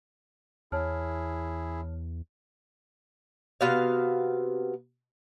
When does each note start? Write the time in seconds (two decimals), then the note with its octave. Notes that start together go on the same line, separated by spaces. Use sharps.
0.72 E2 E4 G#4 C#5 A5 F6
3.61 C3 B3 F#4 F5